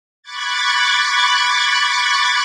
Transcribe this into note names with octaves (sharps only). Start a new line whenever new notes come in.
B5 C#6 D6 F#6 G#6 A6